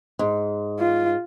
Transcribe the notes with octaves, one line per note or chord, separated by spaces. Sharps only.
G#2
F4